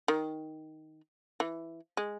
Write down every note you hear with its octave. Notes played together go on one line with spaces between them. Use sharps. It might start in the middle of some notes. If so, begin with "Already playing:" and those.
D#3
E3
G#3